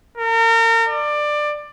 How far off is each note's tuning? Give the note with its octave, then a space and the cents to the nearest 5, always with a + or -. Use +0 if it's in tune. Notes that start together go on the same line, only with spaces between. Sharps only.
A#4 -35
D5 +20